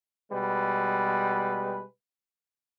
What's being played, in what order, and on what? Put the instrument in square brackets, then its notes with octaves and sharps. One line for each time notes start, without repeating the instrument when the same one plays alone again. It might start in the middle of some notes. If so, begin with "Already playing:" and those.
[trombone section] B2 G3 G#3 B4